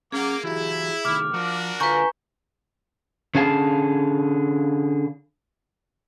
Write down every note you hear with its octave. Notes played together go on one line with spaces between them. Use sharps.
A#3 C#4 G#4 F#5 D6
E3 E4 F#4 G4
C2 D#3 D6 F6
F3 D4 F#4 A#4
D3 F4 B4 G#5 A#5 C#6 G6
D3 C#4 G#4 F5 A5